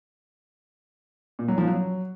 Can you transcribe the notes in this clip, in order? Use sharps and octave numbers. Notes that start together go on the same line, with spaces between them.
A#2
F#3
F3
F#3